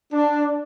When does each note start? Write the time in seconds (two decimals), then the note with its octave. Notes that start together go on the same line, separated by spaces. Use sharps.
0.13 D4